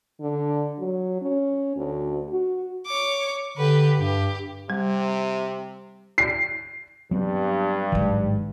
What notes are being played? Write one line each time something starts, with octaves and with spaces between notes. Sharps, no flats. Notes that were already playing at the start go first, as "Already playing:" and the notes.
D3
F#3
C#4
D2
F#4
C#5 D6
D3 G4 B4
G2 G4
C3 G3
C7
G2 F#3 B3 C4
A1 G#2 D#3 F#3